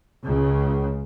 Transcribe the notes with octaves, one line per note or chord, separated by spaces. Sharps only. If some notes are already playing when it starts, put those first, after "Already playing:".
C#2 C#3